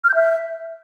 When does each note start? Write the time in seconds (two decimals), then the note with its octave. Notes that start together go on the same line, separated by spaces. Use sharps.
0.04 F6
0.09 G6
0.15 E5